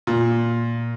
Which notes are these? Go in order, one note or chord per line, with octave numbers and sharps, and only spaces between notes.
A#2